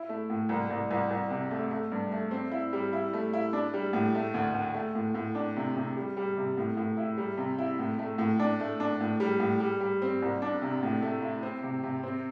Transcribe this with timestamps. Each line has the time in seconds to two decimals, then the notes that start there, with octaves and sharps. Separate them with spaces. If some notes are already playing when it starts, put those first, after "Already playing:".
Already playing: E4
0.09 A3
0.30 A2
0.49 C2
0.70 C2
0.91 C2
1.11 C2
1.30 C3
1.51 A3
1.71 A3
1.92 G2
2.12 A3
2.31 C4
2.52 E4
2.73 G3
2.93 E4
3.13 A3
3.33 E4
3.53 D4
3.74 G3
3.93 A2
4.15 A3
4.34 D2
4.54 D2
4.74 A3
4.95 A2
5.15 A2
5.35 D4
5.56 C3
5.76 C3
5.97 G3
6.17 G3
6.37 C3
6.57 A2
6.77 A2
6.97 E4
7.17 G3
7.37 C3
7.58 E4
7.79 A2
7.99 A3
8.18 A2
8.39 D4
8.60 A3
8.80 D4
9.01 A2
9.20 G3
9.40 A2
9.60 G3
9.80 G3
10.02 C4
10.22 C2
10.42 D4
10.62 C3
10.83 A2
11.02 A3
11.22 E4
11.43 C4
11.63 C3
11.83 C3
12.03 C4